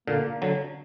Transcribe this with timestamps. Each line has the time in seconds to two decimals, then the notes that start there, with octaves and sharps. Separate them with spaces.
0.07 A#2 D3 A#3
0.42 D3 F#3